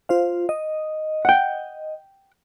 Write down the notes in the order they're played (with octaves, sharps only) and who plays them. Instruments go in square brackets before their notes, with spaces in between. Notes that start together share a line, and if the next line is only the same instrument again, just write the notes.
[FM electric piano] F4 C5 F5
D#5
[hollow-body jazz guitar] F#5 G5